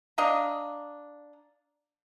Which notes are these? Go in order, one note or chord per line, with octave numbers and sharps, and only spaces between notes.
D4 D#5 F5 A#5